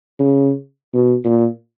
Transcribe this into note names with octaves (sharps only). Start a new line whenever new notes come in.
C#3
B2
A#2